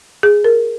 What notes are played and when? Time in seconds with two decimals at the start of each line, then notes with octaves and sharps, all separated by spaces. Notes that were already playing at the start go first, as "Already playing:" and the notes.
0.23 G#4
0.44 A#4